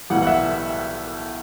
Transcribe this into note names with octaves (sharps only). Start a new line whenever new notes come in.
B1 A2 E3 G3 F#5
F#5
E5